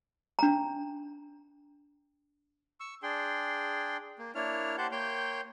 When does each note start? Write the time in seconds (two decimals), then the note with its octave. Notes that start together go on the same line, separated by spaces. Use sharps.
0.39 D4 A#5
2.80 C#6 E6
3.03 D4 G#4 G5 C6
4.19 A#3
4.35 A#3 D4 E4 C#5 F6
4.78 G4 C5 F#5 A5 G6
4.92 A#3 C#5 G5 C6 G6